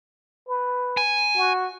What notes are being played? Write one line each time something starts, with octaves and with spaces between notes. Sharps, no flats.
B4
G#5
F#4